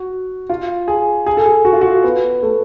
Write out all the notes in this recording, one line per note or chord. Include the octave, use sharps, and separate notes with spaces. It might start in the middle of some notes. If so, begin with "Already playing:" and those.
Already playing: F#4
F4
G#4
G#4
A4
G#4
F#4
F4
F#4
B3
A3